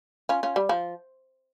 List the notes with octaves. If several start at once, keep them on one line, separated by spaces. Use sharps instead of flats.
C#4 F4
C#4 F4
G3
F3